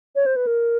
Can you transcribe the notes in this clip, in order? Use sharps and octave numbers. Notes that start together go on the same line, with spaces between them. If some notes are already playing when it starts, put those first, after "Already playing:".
C#5
C5
B4
A#4